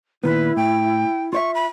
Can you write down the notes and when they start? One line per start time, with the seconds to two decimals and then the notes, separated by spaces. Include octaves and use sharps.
0.24 A#2 D#3 B3 E4 B4
0.56 A2 G5
1.33 F4 D5 E5 C#6
1.55 B5